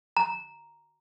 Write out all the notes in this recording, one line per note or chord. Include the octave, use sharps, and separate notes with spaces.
A#5